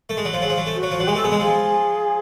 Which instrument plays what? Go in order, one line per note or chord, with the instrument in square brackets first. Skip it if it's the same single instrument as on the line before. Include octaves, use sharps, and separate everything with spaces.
[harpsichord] A3
G#3
F#3
F3
[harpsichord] F#3 [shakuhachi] G#4
[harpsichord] F3
F#3
A3
[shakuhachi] F#4
[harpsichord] F#3
F3
[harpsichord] F#3 [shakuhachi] F#4
[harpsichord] G#3 [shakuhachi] G#4
[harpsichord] A3 [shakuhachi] A4
[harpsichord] B3 [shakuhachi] G#4
[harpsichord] G#3
[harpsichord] F3 [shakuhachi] G#4